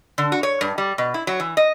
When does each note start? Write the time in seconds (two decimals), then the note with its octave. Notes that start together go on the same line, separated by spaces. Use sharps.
0.18 D3
0.32 F#4
0.43 C#5
0.61 G2
0.78 G3
0.98 B2
1.14 E4
1.27 F#3
1.40 E3
1.57 D#5